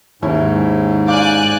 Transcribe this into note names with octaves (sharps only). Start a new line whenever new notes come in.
D#2 G#2 C#4 E4
D5 F5 G#5 D6 F#6 G6